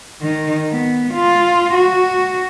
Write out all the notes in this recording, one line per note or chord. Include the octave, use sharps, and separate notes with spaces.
D#3
B3
F4
F#4